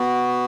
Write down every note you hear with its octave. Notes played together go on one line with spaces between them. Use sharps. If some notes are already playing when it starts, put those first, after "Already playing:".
Already playing: B3 F#4